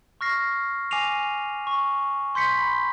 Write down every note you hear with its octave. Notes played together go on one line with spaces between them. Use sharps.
C#6 F6 A#6 C7
G#5 D6 A#6 C7 D#7 F7
C#6
C6 G6 B6 C#7
B5